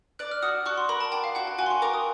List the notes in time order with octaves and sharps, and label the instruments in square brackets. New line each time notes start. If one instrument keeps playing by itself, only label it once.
[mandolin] D5 [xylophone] F#6
[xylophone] F6
[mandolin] F#4 [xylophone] D#6
[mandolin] F#4 [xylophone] C#6
[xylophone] C6
[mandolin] A#4 [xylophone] B5
[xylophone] A5
[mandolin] D5 [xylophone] G5
[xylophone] F5
[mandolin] F#4 [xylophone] F#5
[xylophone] G5
[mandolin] F#4 [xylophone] G#5
[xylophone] C6
C#6
[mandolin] A#4 [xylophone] D6
[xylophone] D#6